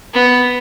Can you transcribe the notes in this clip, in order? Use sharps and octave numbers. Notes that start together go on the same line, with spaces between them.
B3